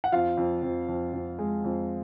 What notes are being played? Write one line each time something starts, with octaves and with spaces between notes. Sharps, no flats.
F#5
F2 F4 F5
F2
F2
F2
F2
G#3
F2